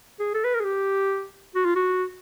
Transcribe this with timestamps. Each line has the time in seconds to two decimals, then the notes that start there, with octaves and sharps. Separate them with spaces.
0.19 G#4
0.34 A4
0.44 B4
0.54 A#4
0.60 G#4
0.64 G4
1.55 F#4
1.65 F4
1.76 F#4